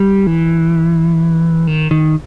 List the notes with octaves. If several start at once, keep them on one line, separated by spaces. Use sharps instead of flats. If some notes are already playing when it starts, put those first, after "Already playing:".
Already playing: G3
E3
D#3
D#3